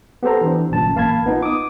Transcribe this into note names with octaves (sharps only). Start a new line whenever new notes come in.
B3 G4 A4 C5 A#5
E3 D4
G1 F#2 A#2 A5
A1 A#3 F5 A5 B5 G#6
B3 D#4 F4
D6 D#6